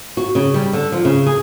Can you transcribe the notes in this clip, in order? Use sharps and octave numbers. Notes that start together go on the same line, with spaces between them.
F#4
C#3
G3
D3
F3
C#3
G#4